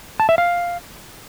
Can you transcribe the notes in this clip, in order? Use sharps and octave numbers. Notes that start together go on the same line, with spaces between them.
A5
E5
F5